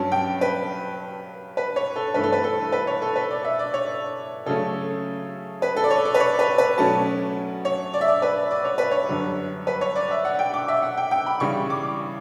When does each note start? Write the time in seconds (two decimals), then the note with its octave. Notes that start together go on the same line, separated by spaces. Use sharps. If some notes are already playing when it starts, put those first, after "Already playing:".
Already playing: G2 F#3 C#4 A5
0.12 G5
0.41 B4
1.57 B4
1.76 C#5
1.96 A4
2.14 G2 E3 A3 B4
2.23 A4
2.32 B4
2.44 A4
2.72 B4
2.87 C#5
3.02 A4
3.16 B4
3.30 D5
3.45 E5
3.59 D5
3.74 C#5
4.46 C#3 F#3 A3 C#4 A4
5.62 B4
5.76 A4
5.84 D5
5.90 C#5
6.05 D5
6.14 B4
6.20 C#5
6.39 B4
6.58 B4
6.78 B2 F#3 A3 C#4 A5
7.65 C#5
7.94 D5
8.01 E5
8.08 D5
8.22 B4
8.51 D5
8.65 C#5
8.78 B4
8.91 C#5
9.09 F#2 D3 G3
9.67 B4
9.81 C#5
9.96 D5
10.11 E5
10.25 F#5
10.39 G5
10.54 D6
10.68 E5
10.82 F#5
10.97 G5
11.11 G5
11.26 B5
11.40 C#3 E3 G3 C#6
11.70 D6